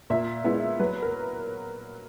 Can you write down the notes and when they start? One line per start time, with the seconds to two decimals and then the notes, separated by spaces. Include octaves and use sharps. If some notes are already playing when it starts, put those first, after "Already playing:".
0.10 A#2 E5
0.44 G#3 B3 E4
0.79 F#3 B4
1.02 A#4